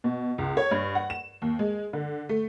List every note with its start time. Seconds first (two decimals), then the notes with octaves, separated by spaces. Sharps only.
0.04 B2
0.38 C#2
0.57 C#5
0.71 G2
0.95 F#5
1.10 E7
1.42 D#2
1.59 G#3
1.93 D3
2.29 A3